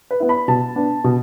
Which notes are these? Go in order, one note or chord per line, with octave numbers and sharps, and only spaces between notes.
B4
B3 E4
B5
B2 A5
B3 D4
B2